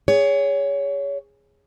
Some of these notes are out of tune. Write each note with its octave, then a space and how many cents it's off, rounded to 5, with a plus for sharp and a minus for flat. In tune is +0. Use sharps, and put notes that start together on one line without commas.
G#4 -20 C#5 +20